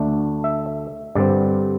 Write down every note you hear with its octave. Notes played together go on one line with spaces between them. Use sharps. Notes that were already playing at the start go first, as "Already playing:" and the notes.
Already playing: D2 D3 A3 D4
E5
G2 D3 G3 C4 D5